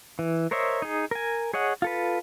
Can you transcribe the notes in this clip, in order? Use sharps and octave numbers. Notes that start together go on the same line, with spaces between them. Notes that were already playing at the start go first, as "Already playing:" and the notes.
E3
A#4 C5 C#5 D#5 E5
D#4 G#4
A#4 G#5
G#4 C#5 D#5 F#5
F4 A4 B4